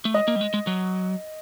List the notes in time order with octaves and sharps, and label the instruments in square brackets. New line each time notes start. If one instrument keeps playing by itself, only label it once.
[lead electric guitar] A3
[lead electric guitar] G#3 [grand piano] D#5
[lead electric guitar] A#3
G3
G#3
G#3
F#3